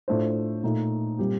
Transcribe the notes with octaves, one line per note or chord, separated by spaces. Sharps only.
A2 A3 D4 F4 C5
A#2 A3 D#4
A#2 G3 C4 G4